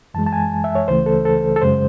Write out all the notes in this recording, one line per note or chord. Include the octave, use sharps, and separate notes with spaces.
F#2 E3 G#3 A5
A5
G#5
E5
C#5
C#2 C#3 E3 A3 C5
A4
A4
A4
F#2 C#3 G#3 C5